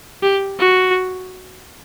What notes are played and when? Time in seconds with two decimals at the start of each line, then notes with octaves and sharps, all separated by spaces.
0.23 G4
0.59 F#4